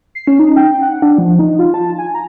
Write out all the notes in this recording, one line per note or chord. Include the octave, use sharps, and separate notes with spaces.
C7
C#4
D#4
G5
F#5
D4
F3
D#4
F4
A5
G#5
A#5